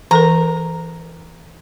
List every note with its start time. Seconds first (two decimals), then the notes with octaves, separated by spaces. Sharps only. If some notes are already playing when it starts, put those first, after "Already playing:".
0.11 E3 A4 A#4 A#5